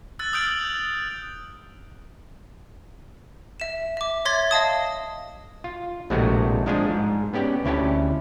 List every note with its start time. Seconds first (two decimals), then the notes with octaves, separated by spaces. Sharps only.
0.19 E6 F#6 A6
0.33 D#6 F6 G6 A6 D7 F#7
3.60 E5 E7
3.97 E5 D6
4.25 C#5 E5 C6 G#6 A6
4.51 D#5 F5 A5 D#6
5.64 F4
6.10 A#1 A2 C3 G#3 A3 F#4
6.66 F3 G#3 D4 F4 G#4
6.91 G#2
7.33 B3 C#4 G4 D5 G5
7.65 D2 C#4 E4 G4 A5